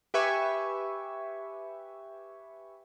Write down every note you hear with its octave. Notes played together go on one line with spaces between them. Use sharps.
G4 B4 E5 G#5 C#6